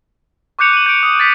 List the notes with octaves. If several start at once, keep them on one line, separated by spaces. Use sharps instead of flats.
C#6 D6 F#6 G6 C#7 F7
D#7 F#7
G6 D7
D#6
A6 B6